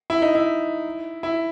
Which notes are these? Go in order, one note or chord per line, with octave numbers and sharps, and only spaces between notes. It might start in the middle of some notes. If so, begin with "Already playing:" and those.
E4
D#4
E4
E4